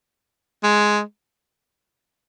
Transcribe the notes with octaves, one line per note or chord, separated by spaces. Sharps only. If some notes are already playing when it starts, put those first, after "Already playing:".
G#3